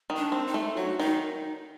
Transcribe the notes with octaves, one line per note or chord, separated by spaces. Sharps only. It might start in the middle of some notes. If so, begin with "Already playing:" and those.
D#3
D4
C4
D#4
A3
F#3 F#4
D#3 D#4